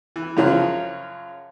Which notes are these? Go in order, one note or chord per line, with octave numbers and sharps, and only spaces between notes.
E3
F#2 C#3 F3 F#3